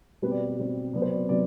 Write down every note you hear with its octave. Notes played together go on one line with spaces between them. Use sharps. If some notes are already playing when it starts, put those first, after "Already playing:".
B2 G3 C4 B4
D5
D5
B2 G3 C4
C3 F#3 B3 D5
C5
D5
C3 F#3 B3 D5